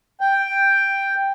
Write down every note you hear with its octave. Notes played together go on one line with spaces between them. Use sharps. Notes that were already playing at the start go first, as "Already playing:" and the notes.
G5